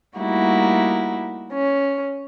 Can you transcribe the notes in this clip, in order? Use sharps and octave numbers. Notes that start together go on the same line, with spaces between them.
G3 A3 A#3 D#4 E4 F#4
C#4